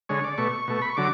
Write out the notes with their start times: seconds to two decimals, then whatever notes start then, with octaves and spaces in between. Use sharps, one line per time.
0.09 D3 G#3 C#5
0.24 D5
0.38 B2 A3 C#6
0.68 B2 A3
0.82 B5
0.90 C#6
0.97 D3 F#3 D6